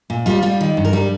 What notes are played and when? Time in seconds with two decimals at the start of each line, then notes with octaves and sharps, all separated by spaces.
0.10 A#2
0.26 G3 F4
0.42 G3 F4
0.61 D#3
0.77 G2
0.85 A#4
0.93 G3